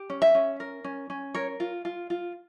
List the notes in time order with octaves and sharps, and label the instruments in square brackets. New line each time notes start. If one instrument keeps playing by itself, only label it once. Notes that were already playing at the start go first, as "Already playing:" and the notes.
Already playing: [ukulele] G4
C#4
E5
C#4
A#4
C#4
C#4
A#4 C#5
F4
F4
F4